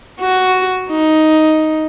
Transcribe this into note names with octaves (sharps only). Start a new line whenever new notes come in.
F#4
D#4